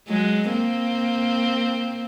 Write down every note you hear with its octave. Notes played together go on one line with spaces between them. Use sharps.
F#3 G#3
A#3 C4